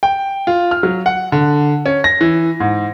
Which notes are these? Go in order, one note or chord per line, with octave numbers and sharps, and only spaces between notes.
G5
F4
F6
F#3
F#5
D3
C#4
A#6
E3
G#2